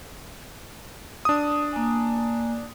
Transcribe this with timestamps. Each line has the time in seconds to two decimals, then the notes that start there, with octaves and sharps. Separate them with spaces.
1.25 D4 D#6
1.72 A#3 G#5